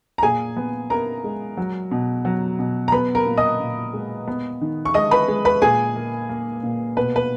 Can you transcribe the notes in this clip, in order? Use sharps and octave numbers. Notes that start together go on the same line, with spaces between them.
A#5
A#2 G#4 G#5
B3
B3 A#4 A#5
G#3
F#3
B2
F#3
B2
A#5
B3 B4 B5
A#4 A#5
A#2
D#5 D#6
A#2
G#3
B3
D#3
C#6
G#3 D#5 D#6
B4 B5
G#3
B4 B5
A#2 G#4 G#5
A#3
A#3
A#2
B2 B4
B4